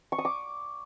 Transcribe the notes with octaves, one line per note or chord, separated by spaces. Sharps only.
C#6
D#6
D6